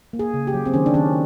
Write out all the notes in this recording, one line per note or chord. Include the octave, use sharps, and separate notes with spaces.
A#3
G#4
C#3
G4
F#3
C4
D#3 C#4
D4
D#3 C#4